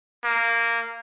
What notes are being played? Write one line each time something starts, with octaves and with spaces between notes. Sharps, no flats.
A#3